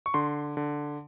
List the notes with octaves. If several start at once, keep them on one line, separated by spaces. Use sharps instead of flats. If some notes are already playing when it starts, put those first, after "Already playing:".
C#6
D3 C6
D3